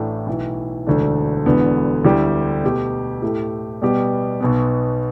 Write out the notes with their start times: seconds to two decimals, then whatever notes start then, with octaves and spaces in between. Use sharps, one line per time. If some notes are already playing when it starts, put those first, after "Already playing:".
Already playing: A1 A2 A3 D4
0.27 B1 A2 E3
0.87 E1 D2 D3 A3 D4
1.46 E1 E2 D3 B3
2.05 D2 D3 G3 E4 G4
2.63 B2 A3 G4
3.22 A2 A3 G4
3.82 B2 G3 B3 G4
4.40 B1 B2 B3